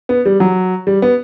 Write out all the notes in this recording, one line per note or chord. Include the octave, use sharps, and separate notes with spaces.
B3
G3
F#3
G3
B3